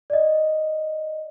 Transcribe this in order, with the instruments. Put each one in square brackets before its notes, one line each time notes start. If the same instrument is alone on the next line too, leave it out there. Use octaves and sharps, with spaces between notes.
[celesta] D5 D#5